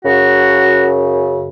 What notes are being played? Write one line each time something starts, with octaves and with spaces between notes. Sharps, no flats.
F#2 C#3 F#4